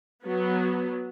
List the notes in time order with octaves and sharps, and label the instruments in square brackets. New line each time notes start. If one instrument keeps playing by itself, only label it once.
[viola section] F#3 B3